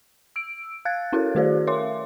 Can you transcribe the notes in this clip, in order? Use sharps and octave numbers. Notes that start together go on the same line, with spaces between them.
E6 D7
F5 F#6 G#6 A6
C#4 E4 F#4 A4 A#4 C#5
D#3 A3 F#4 G#4 C5 D5
A#4 C#5 E5 F5 C6 D6